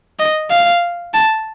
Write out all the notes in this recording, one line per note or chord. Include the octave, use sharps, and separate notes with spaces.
D#5
F5
A5